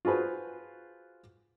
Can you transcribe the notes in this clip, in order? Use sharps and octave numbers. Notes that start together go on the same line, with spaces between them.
F4 F#4 G#4 B4 C5